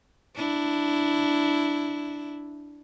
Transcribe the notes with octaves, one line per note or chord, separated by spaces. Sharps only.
D4 E4